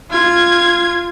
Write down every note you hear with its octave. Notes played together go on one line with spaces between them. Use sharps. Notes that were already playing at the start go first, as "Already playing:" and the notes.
F4 G#6